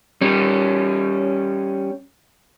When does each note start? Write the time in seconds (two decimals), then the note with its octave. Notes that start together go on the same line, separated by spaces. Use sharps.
0.21 G3 C#4